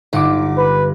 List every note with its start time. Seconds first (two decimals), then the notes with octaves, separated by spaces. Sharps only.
0.13 G1 D#4 F#5 D6
0.58 B4